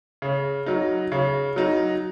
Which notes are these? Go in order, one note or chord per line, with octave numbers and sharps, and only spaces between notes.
C#3
F#3 D#4
C#3
F#3 D#4